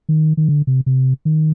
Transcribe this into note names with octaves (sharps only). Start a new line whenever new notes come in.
D#3
D#3
D3
C3
C3
D#3